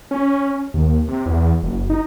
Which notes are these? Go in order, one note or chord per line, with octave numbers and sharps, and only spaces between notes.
C#4
D#2
C3
E2
F#1
D#4